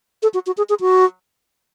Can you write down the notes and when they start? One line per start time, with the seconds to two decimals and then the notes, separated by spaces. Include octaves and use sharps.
0.22 A4
0.34 F#4
0.46 F#4
0.57 G#4
0.69 G#4
0.80 F#4